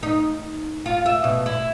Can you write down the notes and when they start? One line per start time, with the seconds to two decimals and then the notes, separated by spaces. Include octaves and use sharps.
0.03 D#4
0.86 F4
1.06 E5
1.24 B2
1.46 E4